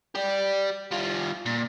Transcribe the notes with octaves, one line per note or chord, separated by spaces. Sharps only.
G4 D5
G3 F4
A#2